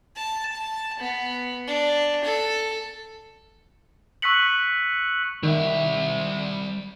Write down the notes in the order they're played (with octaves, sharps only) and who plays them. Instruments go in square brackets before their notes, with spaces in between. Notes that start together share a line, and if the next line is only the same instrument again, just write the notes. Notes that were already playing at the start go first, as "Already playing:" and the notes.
[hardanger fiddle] A5
A5
B3
D4
A4
[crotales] C#6 E6 F#6 B6 C#7 F#7
[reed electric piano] D#3 [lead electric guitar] G3 E5